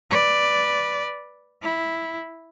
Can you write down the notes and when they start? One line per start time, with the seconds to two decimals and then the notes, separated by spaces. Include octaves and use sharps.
0.10 B4 D5
1.62 E4